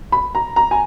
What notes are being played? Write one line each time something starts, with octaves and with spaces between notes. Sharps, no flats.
B5
A#5
A#5
G#5